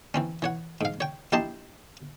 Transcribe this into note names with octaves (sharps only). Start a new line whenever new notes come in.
E3 C4 C#4
E3 C#5 F#5
G#2 F5
C#5 G5
A#1 E4 G4 D#5 A5 C6